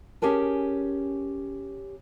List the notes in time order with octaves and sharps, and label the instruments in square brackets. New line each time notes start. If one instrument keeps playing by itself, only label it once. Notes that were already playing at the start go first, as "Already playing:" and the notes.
[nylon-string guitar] C#4 G4 G#4 A#4 A5